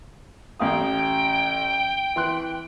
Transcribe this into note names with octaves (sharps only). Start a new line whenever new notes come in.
A1 F5 G5 D#6
E3 C6 F#6